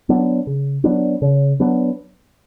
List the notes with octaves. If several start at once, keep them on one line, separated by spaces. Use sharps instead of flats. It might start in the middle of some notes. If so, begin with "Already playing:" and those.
F#3 B3 D4
C#3
F#3 B3 D4
C#3
F#3 B3 D4